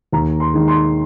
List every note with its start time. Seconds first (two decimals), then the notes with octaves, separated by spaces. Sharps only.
0.12 D#2 A#5
0.40 C6
0.54 D#3 G#3
0.68 C6